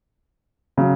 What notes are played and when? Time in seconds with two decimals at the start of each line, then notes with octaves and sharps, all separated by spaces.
0.77 C#3 F#3